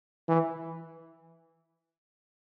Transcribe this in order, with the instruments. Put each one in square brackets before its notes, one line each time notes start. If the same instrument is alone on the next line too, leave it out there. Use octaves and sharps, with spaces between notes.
[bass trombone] E3